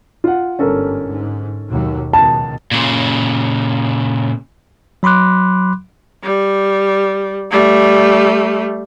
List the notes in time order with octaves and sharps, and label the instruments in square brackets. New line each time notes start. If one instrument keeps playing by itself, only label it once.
[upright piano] F4 F#5
[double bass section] G1 G#2 [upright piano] C#4 A4 A#4
[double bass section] G#2
D#2 B2 F#3
[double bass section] C#2 B2 D#3 [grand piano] A5
[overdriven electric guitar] A#2 C#3
[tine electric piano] F#3 B5 C6 D6 F#6
[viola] G3
G3 A3